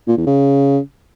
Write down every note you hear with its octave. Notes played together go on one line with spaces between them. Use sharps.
A#2
E2
C#3